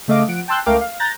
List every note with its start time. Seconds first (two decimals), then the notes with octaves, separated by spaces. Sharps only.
0.08 C#3 A3 D#5 F5 D6
0.28 F3 F#5 D7
0.48 G5 A5 C6 E6 F#6 G6
0.66 C#2 A3 A#4 F5 G5 D6
0.81 F5
0.99 A#5 F#6 G6 A6 A#6